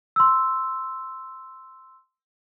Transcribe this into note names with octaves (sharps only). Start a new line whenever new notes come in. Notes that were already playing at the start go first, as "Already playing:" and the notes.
C6 E6